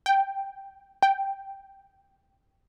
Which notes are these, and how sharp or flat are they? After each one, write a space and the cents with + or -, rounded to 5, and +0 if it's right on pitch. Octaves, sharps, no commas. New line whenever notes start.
G5 +0
G5 +0